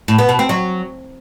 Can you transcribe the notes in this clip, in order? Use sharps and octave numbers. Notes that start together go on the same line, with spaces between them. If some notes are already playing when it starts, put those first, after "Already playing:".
A2
B3
B2
C4
F#3